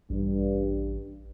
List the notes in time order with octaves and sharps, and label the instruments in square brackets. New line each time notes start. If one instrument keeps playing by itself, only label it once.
[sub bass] A1 [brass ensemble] G2